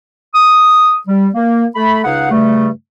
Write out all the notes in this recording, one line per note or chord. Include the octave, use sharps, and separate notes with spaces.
D#6
G3
A#3
A3 B5
C#2 C#3 D#4 G#4 F5 F#5
G2 C#3 G3 A3